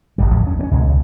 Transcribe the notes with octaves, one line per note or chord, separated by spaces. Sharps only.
D1 C#2 G3
D#2 A2 F3 F#3
C#4
A#3 C#4
C#2 B2 G3 G#3
C#2